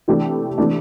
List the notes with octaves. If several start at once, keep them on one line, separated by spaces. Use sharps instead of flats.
C3 E3 A3 D4 G4
C3 E3 A3 D4